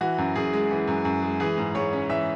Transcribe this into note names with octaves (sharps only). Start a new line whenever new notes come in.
E3 F#4
F#2
F#2 G#4
G#3
E3
F#2
F#2
G#3
E3 G#4
G#2
G#2 C#5
C#4
E3 E5